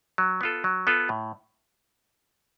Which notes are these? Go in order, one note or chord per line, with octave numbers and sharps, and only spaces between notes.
F#3
B3 F4 A4
F#3
B3 F4 A4
A2